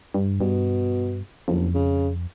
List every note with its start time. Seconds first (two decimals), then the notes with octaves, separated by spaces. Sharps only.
0.14 G2
0.41 G2 B2
1.48 F#1 F2
1.74 C#3